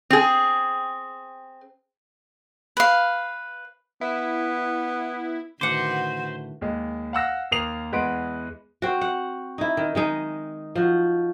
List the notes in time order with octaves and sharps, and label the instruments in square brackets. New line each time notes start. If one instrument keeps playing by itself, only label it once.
[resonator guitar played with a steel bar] C4 G#4
[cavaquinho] B4 F5
[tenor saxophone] B3 [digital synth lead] E4
[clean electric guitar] A2 D3 [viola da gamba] D#3 F#4 B4 [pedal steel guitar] C5 [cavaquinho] F#5 D6
[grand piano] D#2 G#3
F5 F#5 E6 A#6
D#2 A#3 D#6 C7 F7
E2 G#3 B4 F#5 C6 D7
[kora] C4 F#4
F#5
D#4 E4
D#3
D#3 G#3 D#4
F3 F#4